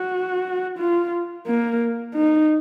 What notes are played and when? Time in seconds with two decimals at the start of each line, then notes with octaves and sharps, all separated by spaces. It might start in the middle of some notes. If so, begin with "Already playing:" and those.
Already playing: F#4
0.78 F4
1.47 A#3
2.15 D#4